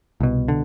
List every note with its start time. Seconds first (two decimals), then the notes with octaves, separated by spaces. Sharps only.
0.20 C2 B2
0.48 D3